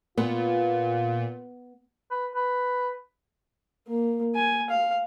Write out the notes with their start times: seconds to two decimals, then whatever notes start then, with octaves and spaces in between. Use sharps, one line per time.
0.17 A#2 B3 F4
2.11 B4
2.35 B4
3.88 A#3
4.35 G#5
4.70 F5